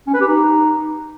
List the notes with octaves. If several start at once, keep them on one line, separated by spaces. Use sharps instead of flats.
C#4
B4
G4
D#4